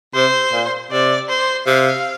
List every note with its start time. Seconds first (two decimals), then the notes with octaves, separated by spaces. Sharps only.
0.14 C3 C5
0.53 A#2
0.91 C3 D5
1.29 C5
1.67 C3 F5